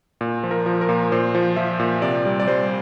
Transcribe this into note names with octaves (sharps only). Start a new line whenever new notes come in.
A#2
F3
A#4
F3
A#4
A#2
A#2 C5
F3
F3 E5
A#2
C3 D5
G3
D5
G3 C5